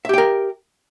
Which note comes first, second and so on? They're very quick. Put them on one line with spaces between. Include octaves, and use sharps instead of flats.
E5 G4 G5 A#4